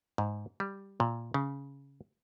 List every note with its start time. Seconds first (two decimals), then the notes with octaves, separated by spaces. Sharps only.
0.18 G#2
0.60 G3
1.00 A#2
1.34 C#3